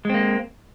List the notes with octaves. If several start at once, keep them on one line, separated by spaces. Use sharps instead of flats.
G#3 A#3 C4